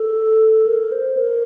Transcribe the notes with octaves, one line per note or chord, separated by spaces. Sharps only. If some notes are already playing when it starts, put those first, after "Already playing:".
Already playing: A4
A#4
C5
A#4